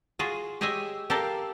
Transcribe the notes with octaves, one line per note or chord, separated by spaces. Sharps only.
F4 F#4 G#4
G4 G#4 C#5 D#5 E5 G#5
G4 A4 A#4 D5 F5